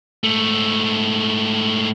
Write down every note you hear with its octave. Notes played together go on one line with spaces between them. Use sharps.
G#2 A3